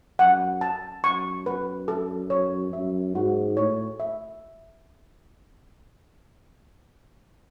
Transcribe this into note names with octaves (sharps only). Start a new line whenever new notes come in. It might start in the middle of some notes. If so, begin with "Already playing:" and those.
F#2 F#5
A5
F#2 C#6
B4
A4
C#5
F#2 E5
G#2 F#4
A2 C#5
E5